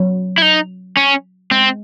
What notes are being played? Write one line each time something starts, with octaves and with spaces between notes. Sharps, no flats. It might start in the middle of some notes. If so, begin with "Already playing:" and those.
Already playing: F#3
E4
D#4
C#4
G#3 C4